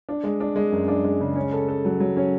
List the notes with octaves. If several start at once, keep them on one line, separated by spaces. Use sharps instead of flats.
D4
G#3
D4
G#3
F#2
D4
G#3
C#3
C#4
A4
A4
F#3
F#3
C#4